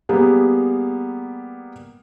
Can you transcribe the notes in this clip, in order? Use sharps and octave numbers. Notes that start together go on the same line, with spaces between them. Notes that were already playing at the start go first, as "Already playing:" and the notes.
G3 A#3 B3 G4 G#4